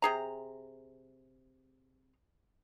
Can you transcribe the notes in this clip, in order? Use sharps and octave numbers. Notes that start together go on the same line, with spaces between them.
C3 G#4 A#5